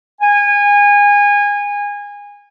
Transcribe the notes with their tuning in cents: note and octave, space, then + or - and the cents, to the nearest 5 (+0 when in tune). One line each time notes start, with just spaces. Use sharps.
G#5 -25